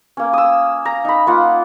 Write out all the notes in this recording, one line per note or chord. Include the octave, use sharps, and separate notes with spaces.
A#3 C#4
D#6 E6
A#5
D#4 B5
A#3 F4 F#5